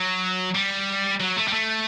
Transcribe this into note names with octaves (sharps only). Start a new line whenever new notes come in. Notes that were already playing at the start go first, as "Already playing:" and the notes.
Already playing: F#3
G3
F#3
A3
G3
A3